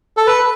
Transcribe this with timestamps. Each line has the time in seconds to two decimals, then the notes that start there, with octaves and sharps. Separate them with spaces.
0.17 A4
0.27 B4